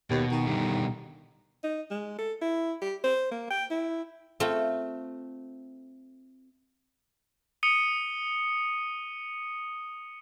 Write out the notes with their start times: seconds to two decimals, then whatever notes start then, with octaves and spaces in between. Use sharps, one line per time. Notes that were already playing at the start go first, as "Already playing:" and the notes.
0.10 D#2 B2
0.31 D#3
0.47 B2 D3 G3
1.64 D#4
1.91 G#3
2.19 A4
2.42 E4
2.82 G4
3.04 C5
3.31 A#3
3.51 G5
3.71 E4
4.40 A3 C4 F4
7.63 D#6 C#7 D#7 G7